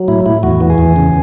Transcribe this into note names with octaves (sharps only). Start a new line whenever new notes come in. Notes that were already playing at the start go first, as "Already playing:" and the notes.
Already playing: F#3
A2 E4
A2 E4
E2 F#4
E3
G#4
E2
C#3